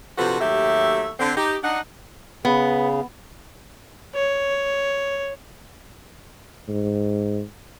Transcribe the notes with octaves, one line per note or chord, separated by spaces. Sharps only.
C3 F3 D4 F#4 A4 B4
D#2 F#3 A3 G4 E5
D3 C4
D#4 G4
D4 D#4 F#5
C#3 B3
C#5
G#2